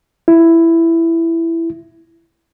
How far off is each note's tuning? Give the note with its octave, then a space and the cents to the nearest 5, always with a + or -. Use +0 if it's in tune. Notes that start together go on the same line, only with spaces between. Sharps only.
E4 +10